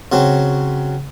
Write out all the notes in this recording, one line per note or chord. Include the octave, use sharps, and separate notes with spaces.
C#3 F#3 C4